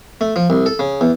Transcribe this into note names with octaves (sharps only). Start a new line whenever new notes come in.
A3
F3
C2
A4
C#3
E2